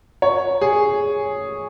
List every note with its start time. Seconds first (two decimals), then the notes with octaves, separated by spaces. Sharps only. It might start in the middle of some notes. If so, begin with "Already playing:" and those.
0.22 C#5
0.61 G#4